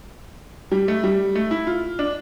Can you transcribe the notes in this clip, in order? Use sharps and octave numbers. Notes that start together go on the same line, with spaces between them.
G3
A3
G3
A3
E4
F4
D4